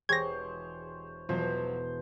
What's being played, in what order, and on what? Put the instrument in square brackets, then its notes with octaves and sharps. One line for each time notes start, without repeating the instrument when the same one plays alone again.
[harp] E1 C7 [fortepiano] G4 G#4 [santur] C5 C#5 [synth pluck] G#6 A#6
[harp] E1 B2 [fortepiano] F3 F#3 [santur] C5